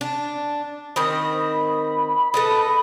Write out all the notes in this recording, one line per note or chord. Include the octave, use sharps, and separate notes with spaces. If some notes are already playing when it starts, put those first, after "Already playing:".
D4
D#3 C4 D#5 B5
A4 B4 D#5